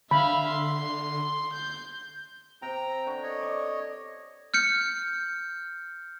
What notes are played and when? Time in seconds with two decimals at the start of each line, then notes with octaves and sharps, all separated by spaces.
0.11 D3 E5 F5 B5
0.48 C6
1.53 G6
2.62 C3 G5 A#5
3.06 D3 C#6
3.23 C#5 D#5
3.40 D5 C#6
4.54 F6 G6 C#7